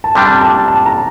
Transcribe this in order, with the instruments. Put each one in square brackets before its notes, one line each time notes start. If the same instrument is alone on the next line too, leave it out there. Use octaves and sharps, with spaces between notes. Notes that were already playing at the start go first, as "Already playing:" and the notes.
[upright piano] A5
[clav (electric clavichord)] C3 G3 D4 [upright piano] G5
[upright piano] A5
A5
A5
A#5